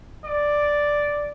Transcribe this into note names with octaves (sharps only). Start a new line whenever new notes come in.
D5